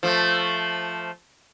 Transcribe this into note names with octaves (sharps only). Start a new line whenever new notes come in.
F3 A3